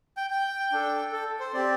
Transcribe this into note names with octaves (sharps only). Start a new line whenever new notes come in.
G5
G5
D4 A4
A4
C5
C4 G4 D5